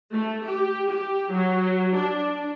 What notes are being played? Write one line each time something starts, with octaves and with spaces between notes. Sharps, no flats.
A3
G4
G4
F#3
D4